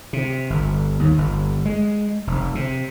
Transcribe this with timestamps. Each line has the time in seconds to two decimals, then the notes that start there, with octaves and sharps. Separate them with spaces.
0.13 C3
0.50 G1
0.99 D#2
1.18 G1
1.65 G#3
2.27 F1
2.55 C3